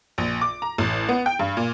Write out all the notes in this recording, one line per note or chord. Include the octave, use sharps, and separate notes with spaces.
A#1
D6
A#5
A1
B3
G5
G2
A#2